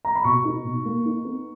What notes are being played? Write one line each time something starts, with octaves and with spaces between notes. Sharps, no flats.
A#5
B5
B2 C#6
D#4
B2
A#3
D#4
B3